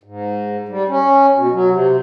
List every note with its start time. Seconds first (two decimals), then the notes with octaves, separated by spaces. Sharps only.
0.03 G#2
0.68 G3
0.88 C#4
1.35 B2
1.51 F#3
1.71 C3